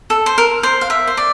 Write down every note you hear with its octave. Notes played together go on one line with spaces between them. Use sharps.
A4
C5
A#4
C5
F5
E5
C5
D5